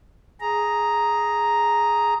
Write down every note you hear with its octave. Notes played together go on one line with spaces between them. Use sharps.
G#4 A#5